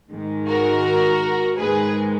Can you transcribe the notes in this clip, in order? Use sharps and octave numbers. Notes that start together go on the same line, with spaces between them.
G#2 D#3 G#3
F#4 A#4
G#2 D#3 G#3 G#4 B4